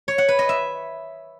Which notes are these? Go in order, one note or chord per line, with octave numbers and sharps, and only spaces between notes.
C#5
F#5
B4
D#5
E5